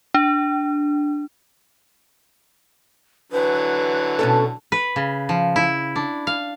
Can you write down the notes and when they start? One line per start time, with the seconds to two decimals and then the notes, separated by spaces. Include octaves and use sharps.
0.14 D4
3.32 D3 E3 F#3 B4
4.19 B2 C#4 A4
4.72 B4
4.96 C#3
5.29 F3
5.56 E4
5.96 D4
6.27 F5